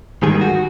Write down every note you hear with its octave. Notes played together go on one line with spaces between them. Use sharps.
G#2 D#3 G3 A#3 G#4
F#4